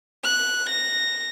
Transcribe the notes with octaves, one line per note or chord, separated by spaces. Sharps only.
F#6
A#6